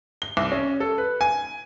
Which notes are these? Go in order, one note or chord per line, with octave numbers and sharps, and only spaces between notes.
G7
C2
C#4
A4
B4
G#5